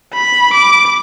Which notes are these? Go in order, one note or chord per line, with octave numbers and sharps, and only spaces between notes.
B5
D6